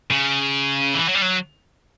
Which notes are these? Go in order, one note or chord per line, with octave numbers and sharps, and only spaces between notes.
C#3
E3
F#3
G3
F#3